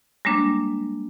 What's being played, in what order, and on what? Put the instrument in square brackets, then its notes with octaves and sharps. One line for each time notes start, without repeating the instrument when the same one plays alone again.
[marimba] G3 G#3 A#3 D4